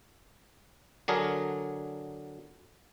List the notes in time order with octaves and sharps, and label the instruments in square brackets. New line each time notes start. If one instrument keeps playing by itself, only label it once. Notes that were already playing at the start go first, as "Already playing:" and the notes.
[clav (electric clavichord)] D3 F#3 D4 G#4 A#4